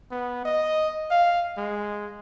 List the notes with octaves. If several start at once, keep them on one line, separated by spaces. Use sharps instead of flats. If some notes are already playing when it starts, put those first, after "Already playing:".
B3
D#5
F5
G#3